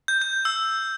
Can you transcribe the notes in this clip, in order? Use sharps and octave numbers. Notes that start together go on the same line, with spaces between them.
G6
G6
E6